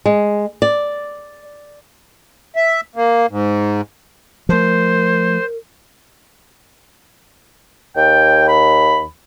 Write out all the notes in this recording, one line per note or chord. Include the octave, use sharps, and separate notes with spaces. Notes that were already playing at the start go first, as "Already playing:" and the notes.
G#3
D5
E5
A#3
G#2
F3 A3 A#4 C5
D#2 G5
B5